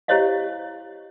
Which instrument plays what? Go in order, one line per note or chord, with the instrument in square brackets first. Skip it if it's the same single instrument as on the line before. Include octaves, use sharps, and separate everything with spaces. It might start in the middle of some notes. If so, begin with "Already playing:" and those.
[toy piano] E4 G4 C5 C#5 D#5 F5